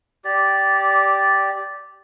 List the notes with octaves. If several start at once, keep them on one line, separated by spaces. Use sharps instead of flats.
G4 D5